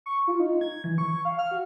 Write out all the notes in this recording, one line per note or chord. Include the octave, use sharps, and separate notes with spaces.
C#6
F4
D#4
G#6
E3
C#6
F5
F6
F#4